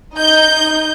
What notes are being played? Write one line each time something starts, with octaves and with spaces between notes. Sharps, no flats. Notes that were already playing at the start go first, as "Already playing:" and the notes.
D#4 D#5 G6